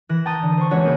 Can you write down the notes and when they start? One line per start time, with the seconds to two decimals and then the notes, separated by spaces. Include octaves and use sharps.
0.09 E3 F#6 A#6 E7
0.25 G5 A5 A#5 D#6 G6
0.42 D3
0.57 C5 C#6
0.71 E3 G#3 C#4 F#4 C#5
0.83 A1 C#3 A#3 B3 D#6 G6